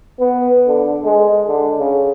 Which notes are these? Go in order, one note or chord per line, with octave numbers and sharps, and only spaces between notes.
B3
D3
G#3
D3
C#3